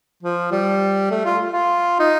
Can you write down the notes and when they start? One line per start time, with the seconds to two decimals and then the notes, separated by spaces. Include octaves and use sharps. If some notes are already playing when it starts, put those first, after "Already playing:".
0.23 F3
0.52 G3
1.11 A3
1.25 F4
1.52 F4
1.99 D#4